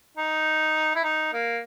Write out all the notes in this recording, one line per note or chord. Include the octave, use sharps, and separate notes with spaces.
D#4
E4
D#4
A#3